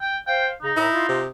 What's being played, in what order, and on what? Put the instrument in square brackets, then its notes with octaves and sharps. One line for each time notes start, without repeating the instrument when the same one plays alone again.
[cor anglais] G5
[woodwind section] C5 F5 [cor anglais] G5
[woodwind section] C#3 G#4 A#5 [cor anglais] D#4
[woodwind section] A2 A#4 A#5 [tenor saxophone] E4
[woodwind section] F4
[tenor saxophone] C3